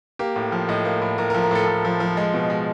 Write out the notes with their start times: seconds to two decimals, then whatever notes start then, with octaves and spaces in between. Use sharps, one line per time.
0.19 A#3 G4
0.36 A2
0.52 F3
0.69 A2 D#5
0.85 A#3
1.01 A2
1.18 A2 A#4
1.30 A#4
1.35 F3
1.43 A#4
1.51 A2 A4
1.67 A2
1.85 F3
2.00 F3
2.17 G#3
2.34 B2
2.50 G#3